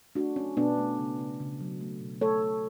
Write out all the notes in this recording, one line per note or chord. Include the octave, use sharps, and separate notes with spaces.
A3 D4 F#4
F#3 C#4
B2 B3 D4
A3
C#3
C#3
C#3
F#3
A3
B2
A3 A4 C#5
A3